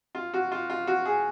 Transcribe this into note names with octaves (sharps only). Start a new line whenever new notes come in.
F4
F#4
F4
F4
F#4
G#4